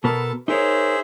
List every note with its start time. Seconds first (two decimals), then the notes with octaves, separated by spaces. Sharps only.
0.04 B2 B3 A4 A#4 A5
0.48 D#4 G#4 A#4 C5 C#5 E5